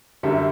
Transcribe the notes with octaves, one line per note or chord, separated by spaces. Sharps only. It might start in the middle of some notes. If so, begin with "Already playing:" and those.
F#2 D3 G3 E5